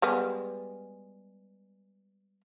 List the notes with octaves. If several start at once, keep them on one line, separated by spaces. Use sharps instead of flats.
G3 G#3 B3